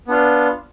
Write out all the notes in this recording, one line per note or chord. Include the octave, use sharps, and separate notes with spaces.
B3 D4 F4